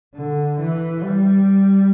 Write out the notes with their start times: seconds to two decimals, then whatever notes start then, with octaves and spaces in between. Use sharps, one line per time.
0.14 D3
0.59 E3
1.03 G3